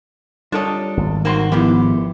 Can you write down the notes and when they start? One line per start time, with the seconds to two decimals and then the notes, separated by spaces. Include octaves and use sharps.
0.52 G3 D4 F4 A4 A#4 C#5 D#5
0.97 G#1
1.25 A#3 C4 D#4 F#4 B5 C6
1.52 G#2 D3 F3 B3 E4 G4 A#4 B4